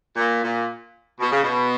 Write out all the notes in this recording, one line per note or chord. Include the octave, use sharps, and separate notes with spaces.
A#2
A#2
B2
C#3
B2